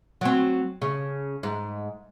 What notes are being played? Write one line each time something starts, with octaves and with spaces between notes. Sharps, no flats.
F#3 C4
C#3
G#2